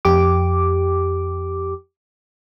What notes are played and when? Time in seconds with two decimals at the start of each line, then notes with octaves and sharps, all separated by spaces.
0.05 F2 G4 D6